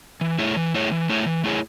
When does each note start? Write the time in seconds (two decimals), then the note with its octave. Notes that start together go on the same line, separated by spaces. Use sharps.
0.21 E3
0.39 A3 E4 G#4 C#5
0.57 E3
0.74 A3 E4 G#4 C#5
0.92 E3
1.10 A3 E4 G#4 C#5
1.26 E3
1.44 A3 E4 G#4 C#5